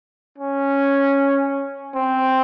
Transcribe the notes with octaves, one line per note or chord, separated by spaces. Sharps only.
C#4
C4